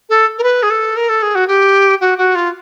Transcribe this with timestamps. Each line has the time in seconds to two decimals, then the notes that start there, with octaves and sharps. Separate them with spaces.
0.09 A4
0.38 A#4
0.43 B4
0.62 G#4
0.70 A4
0.96 A#4
1.09 A4
1.22 G#4
1.35 F#4
1.47 G4
2.01 F#4
2.18 F#4
2.35 F4